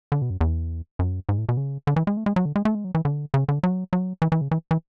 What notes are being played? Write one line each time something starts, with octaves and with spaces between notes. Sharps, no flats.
D3
B2
F#2
E2
F#2
G#2
A2
B2
C#3
D3
E3
G#3
A3
G#3
F#3
D3
G#3
A3
G#3
F#3
E3
D3
C#3
D3
F#3
F#3
E3
E3
C#3
E3
E3